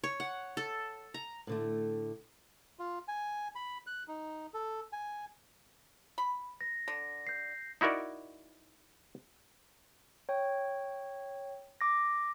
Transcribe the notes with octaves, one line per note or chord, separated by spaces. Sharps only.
C#5
F#5
A4
A#5
A2 D3 A3
F4
G#5
B5
F#6
D#4
A4
G#5
B5
A#6
D3 A#6
G6 C7
D#4 E4 F#4 A#4 D5
C#5 G5
D6 A#6